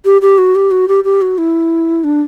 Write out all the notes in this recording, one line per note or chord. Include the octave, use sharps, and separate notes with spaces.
G4
G4
F#4
G4
F#4
G4
G4
F#4
E4
D4